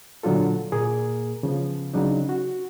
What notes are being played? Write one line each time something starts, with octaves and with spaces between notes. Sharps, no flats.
A#2 D3 F#3 D4 F4 A4
A#2 A#3 G#4 A#4
C#3 F3 B3
C#3 F#3 D4 D#4
F#4